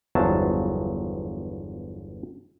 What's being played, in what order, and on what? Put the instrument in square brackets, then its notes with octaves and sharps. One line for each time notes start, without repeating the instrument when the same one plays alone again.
[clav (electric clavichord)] G1 E2 F3 F#3 A5